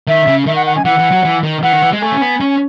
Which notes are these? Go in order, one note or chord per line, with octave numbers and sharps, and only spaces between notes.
D#3 E5
C#3
D#3 E5
F#5
F#5
G#5
E3 F#5
E3
F#3
E3
D#3
E3 F#5
D#3
E3
G#3
A3 G#5
C#4
B3
C#4